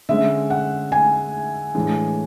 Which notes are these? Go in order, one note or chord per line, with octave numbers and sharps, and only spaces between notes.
D3 G#3 C#4 E5
F#5
G#5
A2 E3 G#3 D4